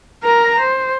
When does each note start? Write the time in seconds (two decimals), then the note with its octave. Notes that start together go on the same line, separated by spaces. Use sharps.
0.24 A#4 A#5
0.59 C5